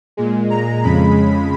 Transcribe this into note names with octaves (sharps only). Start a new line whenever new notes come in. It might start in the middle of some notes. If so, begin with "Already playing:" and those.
A#2 G#3
A#5
F2 C#3 G#3 B5